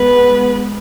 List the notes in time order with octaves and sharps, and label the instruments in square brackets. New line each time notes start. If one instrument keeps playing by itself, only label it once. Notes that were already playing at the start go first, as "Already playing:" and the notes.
Already playing: [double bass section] G#3 B3 [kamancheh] B4